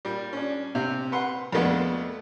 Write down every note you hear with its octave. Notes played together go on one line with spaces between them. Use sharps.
A#2 G3
C#4 D4
C3
B4 F#5 C6
F2 A#2 G#3 A3 B3 D4